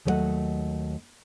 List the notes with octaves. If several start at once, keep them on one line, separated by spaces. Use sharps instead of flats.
D#2 F#3 A3 C#5 D#5 F#5